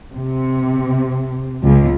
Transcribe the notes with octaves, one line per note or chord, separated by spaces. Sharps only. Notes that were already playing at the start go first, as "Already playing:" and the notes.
C3
C#2